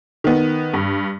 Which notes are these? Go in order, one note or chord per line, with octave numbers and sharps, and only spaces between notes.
D#3 B3
G2